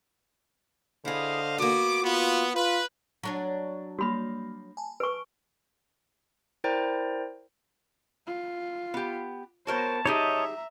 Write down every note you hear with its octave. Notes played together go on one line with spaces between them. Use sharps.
D3 E4 G#4 C5 D#5 F5
A#3 B3 F#4 D6
B3 F4
F4 B4
F#3 D4 C#5
G3 A#3 F#4 B5
G#5 A5
B4 C#6 D7
E4 A#4 C5 D5 G5 A#5
F4
B3 G4
B3 F#4 A#4 C5 C#5 A5
D#4 G4 G#4 C#5 D#5 E5 A#5